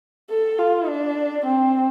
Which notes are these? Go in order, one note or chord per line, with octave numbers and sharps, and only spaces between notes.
A4
F4
D4
C4